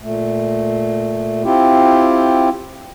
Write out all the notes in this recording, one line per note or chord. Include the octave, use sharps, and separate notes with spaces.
A#2 A3
C4 E4 F4 G4